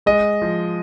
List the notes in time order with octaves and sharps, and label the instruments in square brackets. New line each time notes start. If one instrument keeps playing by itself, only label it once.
[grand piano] G#3 D#5
F3